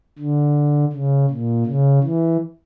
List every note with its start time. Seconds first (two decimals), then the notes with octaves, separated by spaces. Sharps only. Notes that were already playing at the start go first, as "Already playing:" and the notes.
0.19 D3
0.93 C#3
1.30 A#2
1.66 C#3
2.04 E3